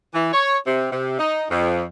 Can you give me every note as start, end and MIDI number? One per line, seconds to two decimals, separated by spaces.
0.14 0.33 52
0.33 0.56 73
0.67 0.91 48
0.92 1.18 48
1.19 1.45 63
1.50 1.84 41